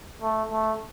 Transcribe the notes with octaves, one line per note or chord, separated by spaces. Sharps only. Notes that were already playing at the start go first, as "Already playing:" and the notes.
A3
A3